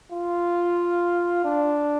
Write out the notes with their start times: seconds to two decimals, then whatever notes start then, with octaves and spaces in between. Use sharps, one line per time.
0.11 F4
1.45 D4